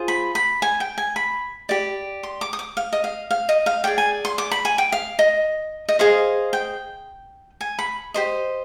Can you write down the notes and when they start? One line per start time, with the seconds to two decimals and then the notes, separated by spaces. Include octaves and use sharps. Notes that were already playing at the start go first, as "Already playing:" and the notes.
Already playing: F4 G#4 C5
0.08 B5
0.35 B5
0.62 G#5
0.80 G5
0.98 G#5
1.16 B5
1.69 G4 D5
2.23 C6
2.41 D6
2.53 D#6
2.59 D6
2.77 F5
2.93 D#5
3.04 F5
3.31 F5
3.49 D#5
3.66 F5
3.84 G#4 D5 G5
3.98 G#5
4.25 C6
4.38 D6
4.51 B5
4.65 G#5
4.78 G5
4.92 F5
5.19 D#5
5.89 D#5
5.99 G#4 C5 D#5 F5
6.53 G5
7.61 G#5
7.79 B5
8.14 G4 C5 D#5